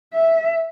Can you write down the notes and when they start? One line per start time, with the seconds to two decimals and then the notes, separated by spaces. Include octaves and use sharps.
0.14 E5